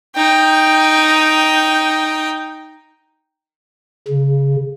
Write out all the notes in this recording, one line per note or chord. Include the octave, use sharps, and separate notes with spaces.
D#4 G5
C#3